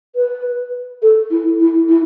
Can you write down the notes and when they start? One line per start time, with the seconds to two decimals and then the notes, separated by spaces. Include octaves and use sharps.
0.16 B4
1.02 A4
1.31 E4
1.60 E4
1.89 E4